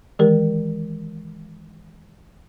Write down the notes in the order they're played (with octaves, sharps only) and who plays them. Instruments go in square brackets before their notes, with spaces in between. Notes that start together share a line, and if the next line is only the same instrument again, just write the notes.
[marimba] D#3 E3 G#3 G4 A#4